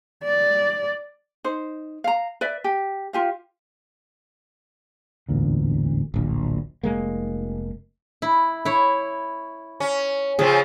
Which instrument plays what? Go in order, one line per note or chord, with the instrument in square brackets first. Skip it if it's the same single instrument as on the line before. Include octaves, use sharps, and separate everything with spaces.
[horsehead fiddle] D5
[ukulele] D#4 C5
F5 A#5
B4 D5 E5
G4
F4 G4 F5
[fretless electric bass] E1 A1 D2 A#2
D1 A#1
F1 G#3 A#3
[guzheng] E4
E4 C#5
[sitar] C#4
[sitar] C#3 F3 C4 [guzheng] G#4